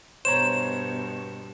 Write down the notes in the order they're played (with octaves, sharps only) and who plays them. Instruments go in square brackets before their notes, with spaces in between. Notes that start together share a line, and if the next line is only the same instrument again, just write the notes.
[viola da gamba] G2 B2 [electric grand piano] C5 C#5 A#5 [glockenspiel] E7